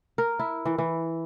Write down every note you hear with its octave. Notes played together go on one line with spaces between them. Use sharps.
A#4
E4
E3
E3